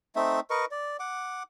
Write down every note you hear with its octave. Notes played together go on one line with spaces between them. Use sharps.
A3 C4 D#4 E5
A#4 B4 D#5 C#6
D5
F#5 D6